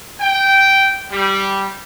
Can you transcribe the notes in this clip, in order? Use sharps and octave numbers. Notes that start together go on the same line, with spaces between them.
G5
G3